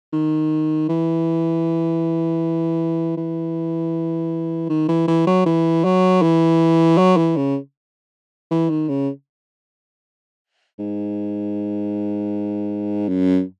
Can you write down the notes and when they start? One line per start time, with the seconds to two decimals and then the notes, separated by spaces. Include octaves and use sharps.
0.13 D#3
0.89 E3
3.17 E3
4.69 D#3
4.89 E3
5.08 E3
5.27 F#3
5.46 E3
5.84 F#3
6.22 E3
6.98 F#3
7.17 E3
7.36 C#3
8.51 E3
8.70 D#3
8.89 C#3
10.79 G#2
13.08 F#2